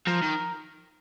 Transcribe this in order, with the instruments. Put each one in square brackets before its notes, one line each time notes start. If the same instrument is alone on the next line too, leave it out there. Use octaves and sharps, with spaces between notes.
[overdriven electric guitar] F3 [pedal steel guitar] A#4
[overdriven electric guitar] D#3